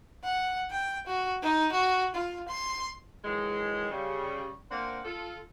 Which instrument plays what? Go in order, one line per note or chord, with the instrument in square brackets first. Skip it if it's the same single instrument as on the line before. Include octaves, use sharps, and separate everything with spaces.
[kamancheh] F#5
G5
F#4
D#4
F#4
F4
C6
[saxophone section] D#3 E3 F#3 G#3
C#3 G3
A#3 C4 D4 C5 F5 F#5
F4 A4